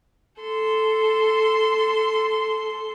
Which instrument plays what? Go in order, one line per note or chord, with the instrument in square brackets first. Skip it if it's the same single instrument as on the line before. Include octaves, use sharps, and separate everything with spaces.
[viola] A4 C6